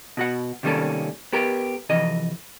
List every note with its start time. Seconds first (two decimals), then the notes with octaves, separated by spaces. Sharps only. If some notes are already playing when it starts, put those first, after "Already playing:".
0.17 B2 F#4 F#5
0.63 C3 D#3 G3 A#3 C#4 A4
1.33 B3 G4 A#4
1.89 F2 C3 E3 D#5